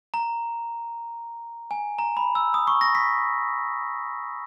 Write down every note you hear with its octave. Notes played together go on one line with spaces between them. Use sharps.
A#5
G#5
A#5
B5
E6
D#6
C#6
A#6
B6